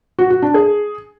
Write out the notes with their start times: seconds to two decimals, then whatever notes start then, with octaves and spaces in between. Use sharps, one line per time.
0.19 F#4
0.30 F#4
0.42 D4
0.54 G#4